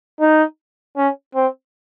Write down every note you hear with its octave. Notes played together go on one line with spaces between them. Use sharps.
D#4
C#4
C4